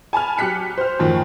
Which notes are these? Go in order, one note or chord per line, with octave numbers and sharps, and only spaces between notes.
G#5 A5 B5 F6
F#3 G4 F#6 B6 C#7
C5 F6
F#2 A2 D#3 F3